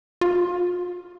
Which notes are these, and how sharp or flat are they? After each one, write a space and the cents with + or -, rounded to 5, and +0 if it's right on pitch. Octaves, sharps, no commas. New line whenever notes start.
F4 +35